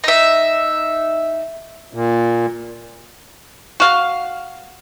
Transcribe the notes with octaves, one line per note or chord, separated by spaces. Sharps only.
D#4 E5
A#2
F#4 F5